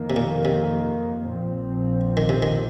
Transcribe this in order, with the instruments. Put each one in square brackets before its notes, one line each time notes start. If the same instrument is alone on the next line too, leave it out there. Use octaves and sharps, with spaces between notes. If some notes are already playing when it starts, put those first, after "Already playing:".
Already playing: [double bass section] F2 D#3 A#3
[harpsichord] C3
A#2
C3
[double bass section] A#1 A#2 F3 C4
[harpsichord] D#3
C3
D#3